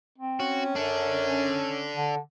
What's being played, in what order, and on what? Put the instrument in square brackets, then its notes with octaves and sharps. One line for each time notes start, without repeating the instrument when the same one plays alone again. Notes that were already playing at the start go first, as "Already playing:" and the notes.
[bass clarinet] C4
[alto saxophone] C#4 [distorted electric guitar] F#4
[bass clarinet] F#2 [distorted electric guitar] D4 A4
[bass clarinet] D3